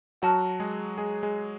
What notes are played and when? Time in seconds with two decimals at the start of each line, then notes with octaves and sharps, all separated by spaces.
0.22 F#3 F#4 F#5 A5 F6
0.60 G#3 G#4
0.98 G#3 G#4
1.23 G#3 G#4